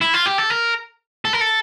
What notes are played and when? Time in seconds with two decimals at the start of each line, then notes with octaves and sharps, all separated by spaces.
0.01 E4
0.14 F4
0.26 G4
0.38 A4
0.50 A#4
1.25 A4
1.33 A#4
1.41 A4